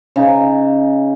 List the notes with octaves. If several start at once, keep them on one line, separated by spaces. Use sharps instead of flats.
C#3 D#4